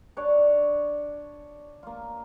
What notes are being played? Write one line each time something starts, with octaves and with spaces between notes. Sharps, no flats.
D4 C#5 D5
A#3 F4